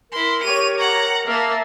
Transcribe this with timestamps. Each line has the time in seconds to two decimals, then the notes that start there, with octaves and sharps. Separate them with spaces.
0.12 E4 A#4 C6
0.43 G4 C#5 D#7 F7
0.79 F#5 A#5
1.28 A#3 E5 A5 F6